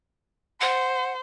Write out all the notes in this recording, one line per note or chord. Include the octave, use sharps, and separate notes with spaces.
C5 F#5